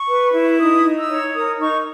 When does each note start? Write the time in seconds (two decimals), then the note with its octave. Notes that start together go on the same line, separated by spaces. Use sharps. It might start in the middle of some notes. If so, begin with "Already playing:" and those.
Already playing: C#6
0.09 B4
0.34 E4
0.60 D#4 D#6
0.84 D#4
0.97 E6
1.09 C#5
1.34 A#4 D#6
1.59 D#4 C#6